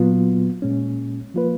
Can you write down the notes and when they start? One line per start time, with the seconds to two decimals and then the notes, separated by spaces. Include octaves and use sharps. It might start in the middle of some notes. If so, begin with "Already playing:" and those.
Already playing: A#2 F#3 B3 F4
0.62 A#2 G#3 C#4
1.34 F3 A#3 F4 B4